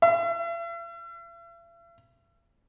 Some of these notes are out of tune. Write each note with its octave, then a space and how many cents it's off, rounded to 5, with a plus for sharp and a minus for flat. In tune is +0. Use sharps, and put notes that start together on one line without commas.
E5 +45